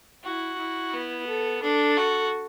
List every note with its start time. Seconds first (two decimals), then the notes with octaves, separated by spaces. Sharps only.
0.24 E4 F#4
0.59 E4
0.93 B3
1.27 A4
1.62 D4 A4
1.97 F#4